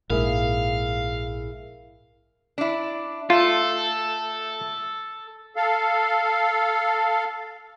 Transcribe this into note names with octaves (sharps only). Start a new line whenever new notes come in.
A#1 G#2 E4 G#4 A#4 E5 F5
D4 E4
A3 F4 A4
A4 F5